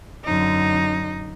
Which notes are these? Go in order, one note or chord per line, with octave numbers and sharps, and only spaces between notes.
F#2 D3 D#4